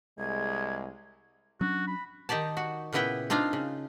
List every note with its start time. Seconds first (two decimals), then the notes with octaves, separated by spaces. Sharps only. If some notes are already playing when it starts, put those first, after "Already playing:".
0.18 C2 G#3 G#6
1.61 F#3 C#4 D4 F#4
1.87 B5
2.29 D#3 D#4 G4 D5 A5
2.57 F#4
2.93 A#2 C#3 B3 E4 B4 G5
3.30 C4 D4 D#4 F4 F5 A#5
3.53 C#3